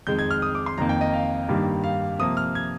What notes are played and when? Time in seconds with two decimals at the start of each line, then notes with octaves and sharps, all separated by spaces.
0.07 F2 D#3 G#3 G6
0.19 G#6
0.31 F6
0.42 D#6
0.55 D6
0.66 C6
0.78 F2 D#3 A#3 A#5
0.89 G5
1.01 D#5
1.13 F5
1.49 G2 D#3 G3 A#3
1.84 F5
2.19 C3 F3 A#3 D#6
2.37 F6
2.55 G#6